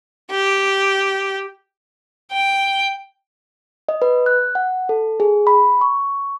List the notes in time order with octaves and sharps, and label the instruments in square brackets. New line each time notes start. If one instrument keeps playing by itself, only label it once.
[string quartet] G4
[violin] G5
[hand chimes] D#5
B4
F#6
F#5
A4
G#4
B5
C#6